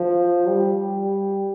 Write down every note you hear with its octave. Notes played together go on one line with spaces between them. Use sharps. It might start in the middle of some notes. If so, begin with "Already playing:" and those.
Already playing: F3
G3